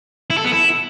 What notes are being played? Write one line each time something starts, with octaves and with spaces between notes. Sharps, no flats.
E4
A4
B3
E4